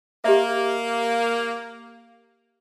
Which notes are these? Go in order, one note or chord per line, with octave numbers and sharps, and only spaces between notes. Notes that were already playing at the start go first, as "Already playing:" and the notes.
A#3 G4 D#5 E5